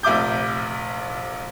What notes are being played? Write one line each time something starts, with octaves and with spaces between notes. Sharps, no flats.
F1 A#1 E5 D6 G6